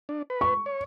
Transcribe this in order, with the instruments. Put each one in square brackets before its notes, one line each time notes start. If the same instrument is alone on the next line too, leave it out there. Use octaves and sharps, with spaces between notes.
[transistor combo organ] D4
B4
[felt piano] C#6
[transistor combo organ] C#5